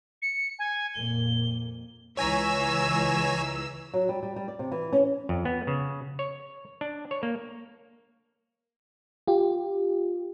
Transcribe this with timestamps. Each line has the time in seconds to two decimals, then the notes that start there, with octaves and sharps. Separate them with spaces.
0.22 C#7
0.59 G#5
0.94 F2 A#2 A#3 G7
2.17 C#2 E3 C#5 G#5 A#5 E6
3.94 F#3
4.09 G3
4.23 G3
4.36 G3
4.48 D5
4.59 C3
4.72 E3
4.93 C#4
5.29 F2
5.45 B3
5.67 C#3
6.19 C#5
6.81 D4
7.11 C#5
7.23 A#3
9.28 F4 G4